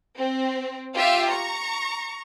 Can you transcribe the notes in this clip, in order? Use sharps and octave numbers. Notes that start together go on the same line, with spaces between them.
C4
F4 G4 E5 F5
A#5 C#6